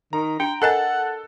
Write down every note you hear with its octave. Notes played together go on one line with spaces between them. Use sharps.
D#3 A#5
D4 G5
A4 A#4 D#5 F#5 G#5 F#6 A6